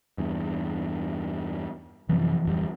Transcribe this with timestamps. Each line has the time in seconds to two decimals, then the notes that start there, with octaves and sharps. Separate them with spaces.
0.18 E2 G2
2.09 F#2 C3 E3 F3
2.45 D1 F2 G3